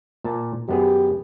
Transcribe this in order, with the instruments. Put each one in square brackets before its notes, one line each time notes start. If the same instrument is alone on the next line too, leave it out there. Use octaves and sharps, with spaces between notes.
[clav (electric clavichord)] A#2 A5
[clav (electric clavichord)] F#2 B3 G#4 [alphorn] G4